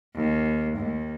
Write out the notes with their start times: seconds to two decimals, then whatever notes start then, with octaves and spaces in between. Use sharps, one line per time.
0.15 D#2
0.77 D#2